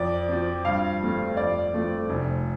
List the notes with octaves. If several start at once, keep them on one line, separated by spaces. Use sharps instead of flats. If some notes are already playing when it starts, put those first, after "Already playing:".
Already playing: F2 D5
F3 C4
G2 F5
F3 A3 C4
F2 D5
F3 A3 C4
F1